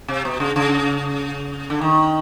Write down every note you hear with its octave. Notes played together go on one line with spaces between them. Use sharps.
C3
B2
C#3
C#3
D3
D#3